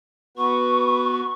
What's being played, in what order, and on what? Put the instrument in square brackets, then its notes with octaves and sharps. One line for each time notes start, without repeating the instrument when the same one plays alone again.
[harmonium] B3 F#4 B4 [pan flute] C#6